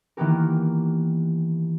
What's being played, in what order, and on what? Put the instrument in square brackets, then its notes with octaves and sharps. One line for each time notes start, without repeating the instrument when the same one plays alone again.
[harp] D#3 E3 A#3 B3 G4 A#4